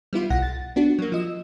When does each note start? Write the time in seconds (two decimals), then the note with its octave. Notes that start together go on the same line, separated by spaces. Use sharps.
0.13 G3 B3 E4 F4
0.30 B1 F#5 A#6
0.42 A6
0.76 B3 D4 F#4
0.99 F#3 A#3
1.12 F3 D#5 E6